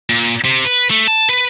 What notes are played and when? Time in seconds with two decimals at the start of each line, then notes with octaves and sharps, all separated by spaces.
0.09 A#2
0.45 C3
0.65 B4
0.90 A3
1.08 A5
1.29 B4